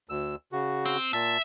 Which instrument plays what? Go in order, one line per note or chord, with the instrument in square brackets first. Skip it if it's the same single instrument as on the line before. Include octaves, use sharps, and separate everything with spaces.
[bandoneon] D2 E6
C#3 F#4
[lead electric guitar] C4
[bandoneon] A#2 A5 [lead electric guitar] E5